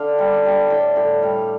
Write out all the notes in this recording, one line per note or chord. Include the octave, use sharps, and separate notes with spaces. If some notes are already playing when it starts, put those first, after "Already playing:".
Already playing: D3 F5
G3
G3
A2 G5
A2 G5
G3 F5